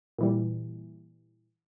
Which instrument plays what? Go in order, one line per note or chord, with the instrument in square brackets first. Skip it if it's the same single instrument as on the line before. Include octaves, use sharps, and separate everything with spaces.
[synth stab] A#2 E3 G3